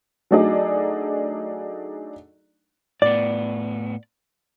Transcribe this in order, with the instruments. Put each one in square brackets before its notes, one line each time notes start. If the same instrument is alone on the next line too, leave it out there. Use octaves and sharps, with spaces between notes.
[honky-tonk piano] F#3 A3 D4 D#4 G#4 D5
[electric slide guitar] A2 B3 [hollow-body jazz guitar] D5